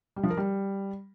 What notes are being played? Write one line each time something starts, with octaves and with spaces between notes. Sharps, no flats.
G3
F3
A#4
G3